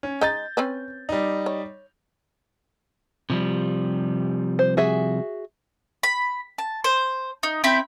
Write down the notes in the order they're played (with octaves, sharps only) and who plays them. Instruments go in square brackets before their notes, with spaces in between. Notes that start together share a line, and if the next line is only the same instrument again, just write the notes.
[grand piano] C#4
[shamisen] G#3 D#4 [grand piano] G6 A6
[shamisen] C4 C#4 B4
[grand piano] G3 D#4
[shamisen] C#5
[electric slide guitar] C3 F3 G3
[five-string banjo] C5
F#4 G#4 E5
[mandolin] B5
A5
C5
D#4
C4 E4 B5 G6